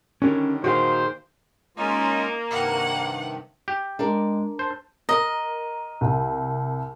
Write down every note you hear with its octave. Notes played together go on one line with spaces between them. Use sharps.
D3 D#3 G3 C#4 A#4 C#5
A#2 D#3 F#4 G#4 C5 F5
G#3 A#3 C#4 D#4 F4
G2 C3 D#3 F#5
G4
G#3 D4 A#4 D5
C5 A5
A#4 D#5
C2